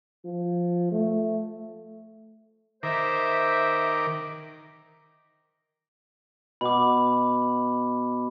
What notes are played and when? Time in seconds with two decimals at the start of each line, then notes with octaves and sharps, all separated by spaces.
0.25 F3
0.91 A3
2.83 D#3 A#4 C5 E5 D6
6.61 B2 B5 D6